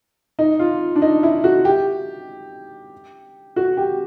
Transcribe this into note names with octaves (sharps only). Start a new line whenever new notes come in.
D#4
F4
D4
D#4
E4
F#4
G4
F#4
G4